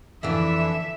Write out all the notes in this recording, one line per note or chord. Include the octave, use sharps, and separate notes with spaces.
F2 D3 E3 E5